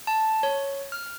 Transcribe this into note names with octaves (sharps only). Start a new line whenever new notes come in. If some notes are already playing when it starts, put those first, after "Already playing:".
A5
C#5
F6